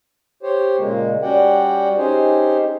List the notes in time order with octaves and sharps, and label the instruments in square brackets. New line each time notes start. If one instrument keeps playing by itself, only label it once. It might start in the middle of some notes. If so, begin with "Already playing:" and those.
[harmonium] G4 C5 C#5
A#2 C#3 G#3 A#3
G3 C#4 F#4 D5 F#5 G5
C#4 D#4 G4 G#4 C5